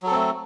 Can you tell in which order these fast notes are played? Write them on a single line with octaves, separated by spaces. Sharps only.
F#3 A4 C4 A3